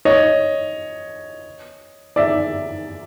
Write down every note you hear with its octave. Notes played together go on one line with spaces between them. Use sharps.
C#5 D#5
D5 E5